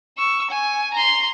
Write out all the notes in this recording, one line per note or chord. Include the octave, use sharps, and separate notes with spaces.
C#6 E6
G#5
A#5 C6